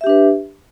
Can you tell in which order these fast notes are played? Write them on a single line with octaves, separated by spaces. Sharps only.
E5 G4 D4 B4